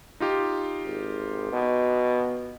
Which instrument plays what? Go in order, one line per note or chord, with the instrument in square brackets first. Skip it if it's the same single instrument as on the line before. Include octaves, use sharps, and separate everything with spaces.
[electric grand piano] D#4 F4 G4
[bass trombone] G#1
B2